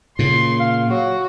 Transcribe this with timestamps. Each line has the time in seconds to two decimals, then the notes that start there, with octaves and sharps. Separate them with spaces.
0.19 A#2 C#3 C6
0.60 F5
0.90 F#3 F#4